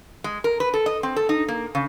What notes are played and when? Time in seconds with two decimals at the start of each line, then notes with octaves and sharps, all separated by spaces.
0.24 G#3
0.44 A#4
0.60 B4
0.74 A4
0.86 D#5
1.03 C4
1.16 A4
1.29 D#4
1.48 A#3
1.75 C#3